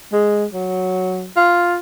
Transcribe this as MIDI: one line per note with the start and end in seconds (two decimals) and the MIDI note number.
0.12 0.45 56
0.53 1.28 54
1.36 1.78 65